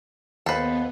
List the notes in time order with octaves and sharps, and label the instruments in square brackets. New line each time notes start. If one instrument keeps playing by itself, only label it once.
[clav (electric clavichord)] D#2 C5 [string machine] B3 [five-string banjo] A4 B4